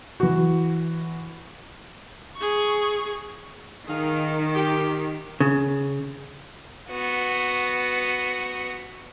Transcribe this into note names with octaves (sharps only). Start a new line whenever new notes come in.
E3 F#4
G#4 C#6
D#3 D#4 G#4 F5
G4
C#3
B3 F#4